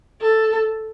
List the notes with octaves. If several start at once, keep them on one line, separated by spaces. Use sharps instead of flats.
A4